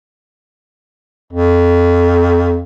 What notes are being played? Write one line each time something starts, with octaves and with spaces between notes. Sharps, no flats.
F2